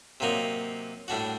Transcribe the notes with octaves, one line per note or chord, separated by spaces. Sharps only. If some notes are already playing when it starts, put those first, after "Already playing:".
C3 F#3 A#3 D#4
A2 G3 D4 F#4